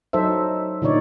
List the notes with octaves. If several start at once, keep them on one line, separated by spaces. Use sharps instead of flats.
F#3 D#4 A4 C5 E5
A#2 D3 D#3 D#4 C#5 D5